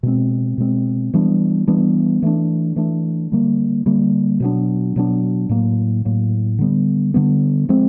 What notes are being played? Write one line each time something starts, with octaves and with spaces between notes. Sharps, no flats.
B2 G#3 C4
B2 G#3 C4
E3 G3 B3 D4
E3 G3 B3 D4
E3 A3 D4
E3 A3 D4
D3 G3 A#3
D3 G3 A#3
B2 F#3 B3 D4
B2 F#3 B3 D4
A2 F#3 A#3
A2 F#3 A#3
D3 G3 B3
D3 G3 B3
F3 G#3 C4